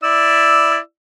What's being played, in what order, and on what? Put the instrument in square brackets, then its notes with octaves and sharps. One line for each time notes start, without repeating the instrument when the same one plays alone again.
[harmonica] E4 D5 E6